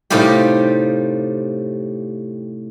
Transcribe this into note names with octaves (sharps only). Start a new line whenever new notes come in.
A2 C3 G3 D#4 F4 G4